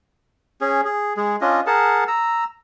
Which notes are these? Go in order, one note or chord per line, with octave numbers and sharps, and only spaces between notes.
C#4 G#4
G#4
G#3 G#4
C#4 D4 F4 D#5
G#4 A#4 F#5 A5
A#5 E6